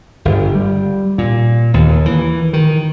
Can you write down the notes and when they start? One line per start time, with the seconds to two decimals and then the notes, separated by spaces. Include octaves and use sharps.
0.25 G1
0.55 G3
1.18 A#2
1.74 D#2
2.06 E3
2.53 D#3